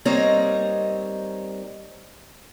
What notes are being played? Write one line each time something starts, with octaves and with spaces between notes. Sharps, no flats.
G3 A#3 C4 D#4 C#5 D#5